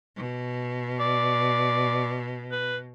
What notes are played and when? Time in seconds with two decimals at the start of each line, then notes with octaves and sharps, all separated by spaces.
0.16 B2
1.00 D5
2.52 B4